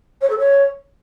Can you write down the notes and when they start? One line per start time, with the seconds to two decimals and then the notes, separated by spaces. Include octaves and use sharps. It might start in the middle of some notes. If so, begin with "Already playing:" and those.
0.21 C#5
0.30 A4
0.38 C#5